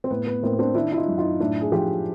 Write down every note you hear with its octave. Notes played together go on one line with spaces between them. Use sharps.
C4
A2 B3
B3
A2 A#3 C4
C4 D4
D#3 D4 E4
E4
D#4 F4
F#2
D#4 F4
A2 D4 E4
G#4
F3 F4 G4